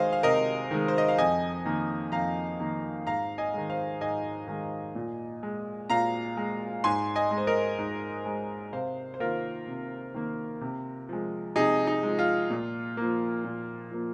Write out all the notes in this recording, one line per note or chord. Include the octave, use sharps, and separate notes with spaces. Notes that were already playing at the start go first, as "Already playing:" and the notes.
Already playing: D#3 G#3 C5 D#5 F5 G#5
F5
C3 A#4 D#5
D#3 G#3
C5
D#5
F5
F2 D#5 G#5
D#3 A#3
F2 F5 A#5
D#3 A#3
G#2 F5 A#5
D#5 G#5
D#3 G#3
C5 F5
G#2 D#5 G#5
D#3 G#3
A#2
G#3
A#2 F5 A#5
G#3
G#2 G#5 C6
D#5 G#5
G#3
C5
A#4 D#5
G#2
G#3
C3 C5 F5
C5
D#3 A#3 F4 A#4
C3
D#3 A#3
C3
F3 G#3
C3 D#4 G#4
D#4
F3 G#3
F4
A#2
F3 A#3
A#2
F3 A#3